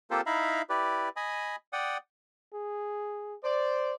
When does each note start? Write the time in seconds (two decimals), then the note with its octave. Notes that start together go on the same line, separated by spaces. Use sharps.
0.11 A#3 C4 F4 G4 A4 C5
0.26 D#4 E4 E5 F5 A#5 B5
0.70 E4 G4 B4 D5
1.16 D#5 G#5 B5 D#6
1.73 D5 F#5 G5 D#6
2.53 G#4
3.44 C5 D5